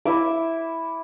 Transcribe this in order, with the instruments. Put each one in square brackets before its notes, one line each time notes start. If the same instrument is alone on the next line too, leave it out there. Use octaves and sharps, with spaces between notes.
[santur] E4 E5 D6